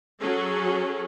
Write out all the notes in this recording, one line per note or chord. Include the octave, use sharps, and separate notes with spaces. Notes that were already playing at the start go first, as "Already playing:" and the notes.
F#3 C#4 G#4 A4